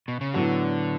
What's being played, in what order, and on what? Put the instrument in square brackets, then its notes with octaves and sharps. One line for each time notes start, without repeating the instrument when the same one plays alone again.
[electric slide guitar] B2
C#3
[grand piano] A2 F#3 B3 F#4 [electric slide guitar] D3